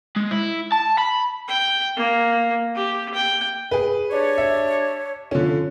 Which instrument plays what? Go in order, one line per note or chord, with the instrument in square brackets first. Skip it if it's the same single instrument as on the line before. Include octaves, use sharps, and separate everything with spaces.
[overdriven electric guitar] G#3
E4
A5
B5
[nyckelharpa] G5
A#3
G4
G5
[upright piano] G#4 B4
[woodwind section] D4 G4 C#5
[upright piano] E5
D3 F3 C#4